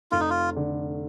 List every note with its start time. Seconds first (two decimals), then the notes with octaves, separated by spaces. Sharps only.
0.11 F1 F4
0.20 D#4
0.30 F4
0.56 D3